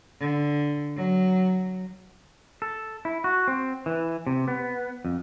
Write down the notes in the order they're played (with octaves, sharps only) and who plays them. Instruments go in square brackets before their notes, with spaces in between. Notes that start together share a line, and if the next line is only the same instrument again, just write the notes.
[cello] D3
F#3
[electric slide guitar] A4
E4
F#4
C4
E3
C3
B3
F2